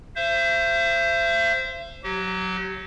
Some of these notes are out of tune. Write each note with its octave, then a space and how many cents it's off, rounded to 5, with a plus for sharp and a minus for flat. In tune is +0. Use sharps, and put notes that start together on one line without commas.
C5 +0 E5 +40
F#3 +0 G4 -35